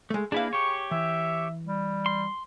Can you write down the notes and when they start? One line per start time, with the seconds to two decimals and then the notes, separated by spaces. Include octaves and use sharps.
0.10 G#3 A3
0.32 A#3 D4 E4 G#4 B4 F5
0.53 G4 C#5 C#6
0.91 E3 E5
1.64 G3
2.06 C6